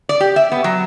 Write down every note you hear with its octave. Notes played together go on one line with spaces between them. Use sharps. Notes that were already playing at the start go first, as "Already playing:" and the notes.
D5
G4
E5
B3
F#3